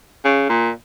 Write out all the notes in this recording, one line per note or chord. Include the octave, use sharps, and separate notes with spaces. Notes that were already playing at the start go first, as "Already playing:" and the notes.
C#3
A#2